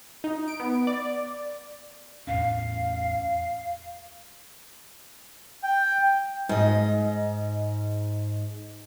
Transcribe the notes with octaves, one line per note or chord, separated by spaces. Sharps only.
D#4
D7
B3
D5
E2 A2 C#4 F5
G5
G#2 D#5